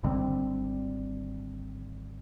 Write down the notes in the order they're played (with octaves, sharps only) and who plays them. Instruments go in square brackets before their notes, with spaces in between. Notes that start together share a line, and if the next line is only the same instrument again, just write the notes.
[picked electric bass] G#1 D3 G3 C4